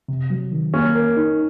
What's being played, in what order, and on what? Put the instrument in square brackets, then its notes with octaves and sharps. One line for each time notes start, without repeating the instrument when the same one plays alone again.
[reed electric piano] C3
F#3
D#3
[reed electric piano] A#3 [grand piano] C#4
[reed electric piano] A#4
D#4